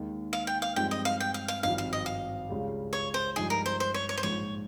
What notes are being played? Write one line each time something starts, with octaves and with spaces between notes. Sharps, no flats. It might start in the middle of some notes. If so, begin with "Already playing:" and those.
Already playing: D#2 D#3 G#3
F5
G5
F5
G2 F3 G#3 C4 D#4 G5
D#5
F5
G5
F5
F5
G#1 G2 F3 C4 D#4 F5
F5
D#5
F5
C#2 C#3 G3
C#5
C5
G2 F3 G#3 D#4 G#4
A#4
C5
C5
C#5
C#5
C5
A#1 G#2 F3 C#5